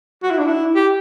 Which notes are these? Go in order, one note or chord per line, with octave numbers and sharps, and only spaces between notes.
F#4
E4
D4
E4
G4